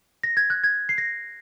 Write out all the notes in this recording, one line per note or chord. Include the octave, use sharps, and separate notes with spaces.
A#6
G#6
F#6
G#6
C7
A#6